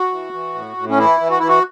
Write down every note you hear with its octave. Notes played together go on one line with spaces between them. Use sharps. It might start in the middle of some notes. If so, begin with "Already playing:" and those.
Already playing: F#4
E3
E3
A2
A2
C#4
E3 E4
E3
F#4
E3 E4
F#4